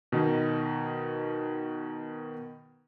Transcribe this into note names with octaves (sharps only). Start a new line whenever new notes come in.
B2 D#3 D#4